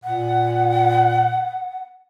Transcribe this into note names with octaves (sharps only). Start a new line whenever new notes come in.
A#2 F#5